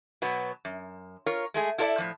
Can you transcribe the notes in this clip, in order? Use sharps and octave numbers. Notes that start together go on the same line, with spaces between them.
B2 F#3 B3
F#2
F4 A#4 C#5
G#3 A3 G#4
E4 F4 A4 A#4 D5 E5
A2 F3